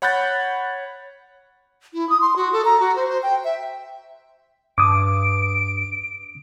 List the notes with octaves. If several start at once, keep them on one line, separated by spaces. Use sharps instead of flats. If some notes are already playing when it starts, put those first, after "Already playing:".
C#5 F#5 B5 F#6 G6 A6
E4
D#6
C6
F#4
A4
A#5
F#4
C5
C5
G5
E5
G2 D6 D#6 D7